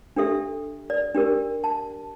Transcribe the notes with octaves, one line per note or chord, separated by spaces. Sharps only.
D4 G4 A4 E5
D5
D4 G4 A#4
A5